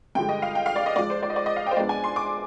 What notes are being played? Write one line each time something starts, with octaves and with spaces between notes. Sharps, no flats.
G2 D3 F3 G#3 G5
D#5
F5
G5
F5
D5
D#5
G#2 F3 G#3 D5
C5
D5
D#5
D5
D#5
F5
G5
C5
G#2 F3 G#3 B3 D4 D5
G#5
C6
D6